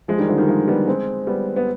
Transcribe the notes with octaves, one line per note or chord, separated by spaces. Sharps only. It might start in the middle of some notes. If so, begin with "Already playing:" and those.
F3 G#3
D#3 G3
D3 F3
D#3 G3
F3 G#3
G3 B3
G#3 C4
G3 B3
B3